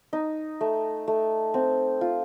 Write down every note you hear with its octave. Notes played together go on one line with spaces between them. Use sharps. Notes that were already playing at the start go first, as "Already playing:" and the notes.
D#4
A3
A3
C4
F4